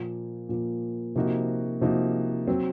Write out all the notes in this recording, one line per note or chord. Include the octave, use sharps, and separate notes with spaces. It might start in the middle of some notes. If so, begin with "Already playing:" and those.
Already playing: A#2 F3 A#3
A#2 F3 A#3
C3 F3 A#3 D#4 F#4
C3 F3 A#3 D#4 F#4
F#3 C4